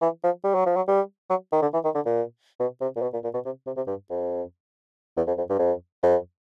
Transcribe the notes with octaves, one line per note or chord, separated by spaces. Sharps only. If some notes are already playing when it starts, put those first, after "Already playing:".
E3
F3
G3
F#3
F3
F#3
G3
F#3
D#3
D3
E3
D#3
D3
A#2
B2
C3
A#2
B2
A#2
A#2
B2
C3
C3
C3
G2
F2
E2
F2
F2
G2
F2
F2